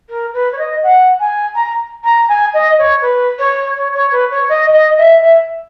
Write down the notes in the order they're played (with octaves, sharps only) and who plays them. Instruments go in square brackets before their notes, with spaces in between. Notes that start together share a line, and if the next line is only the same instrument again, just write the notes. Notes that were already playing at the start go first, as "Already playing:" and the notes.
[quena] A#4
B4
C#5
D#5
F#5
G#5
A#5
A#5
G#5
D#5
C#5
B4
C#5
C#5
C#5
B4
C#5
D#5
D#5
E5
E5